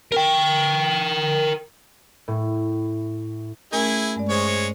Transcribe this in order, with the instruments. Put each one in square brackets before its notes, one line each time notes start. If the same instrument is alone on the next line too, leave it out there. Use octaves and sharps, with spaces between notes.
[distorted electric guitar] A#4 G5
[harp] A2
[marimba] A3 C#4 A#4 [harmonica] E4 G#4 G#5
[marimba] G2 G#3 D5
[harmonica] G#3 C#5 [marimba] C5
[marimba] C5